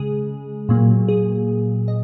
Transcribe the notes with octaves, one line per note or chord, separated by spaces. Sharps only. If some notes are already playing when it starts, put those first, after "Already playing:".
Already playing: C#3 G#3 G#4
A#2 F#3 A#3
G#4
D#5